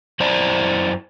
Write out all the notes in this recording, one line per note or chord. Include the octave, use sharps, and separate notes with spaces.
F#2 E4 C5 D5 A#5